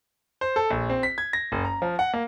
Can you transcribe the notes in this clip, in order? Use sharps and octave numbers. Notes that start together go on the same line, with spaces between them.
C5
A4
A#1
C4
B6
G#6
A#6
F#1
A#5
F3
F#5
A#3